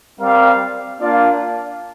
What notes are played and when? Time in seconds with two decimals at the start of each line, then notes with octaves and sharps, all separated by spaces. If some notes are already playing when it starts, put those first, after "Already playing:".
0.20 G3 C4 A#4 F5
1.00 A#3 D4 F4 D5 F5